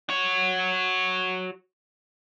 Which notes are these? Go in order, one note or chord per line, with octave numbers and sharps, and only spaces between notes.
F#4 C#5